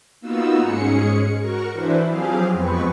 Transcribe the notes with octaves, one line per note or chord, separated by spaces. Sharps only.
A#3 B3 D#4 F4 F#4 E6
G#2 G#3 C#4 G#4 C#7
F#4 A#4 C#6
E3 D4 E4 B4 C5
F3 F#3 C4 G4 G#4 F5
F2 G#3 B3 C4 B4 C#6